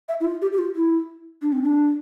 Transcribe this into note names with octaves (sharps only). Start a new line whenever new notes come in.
E5
E4
F4
G4
G4
F4
E4
D4
C4
D4